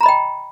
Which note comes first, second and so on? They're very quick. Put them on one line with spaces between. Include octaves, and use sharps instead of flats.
A#5 B5 D#5 G5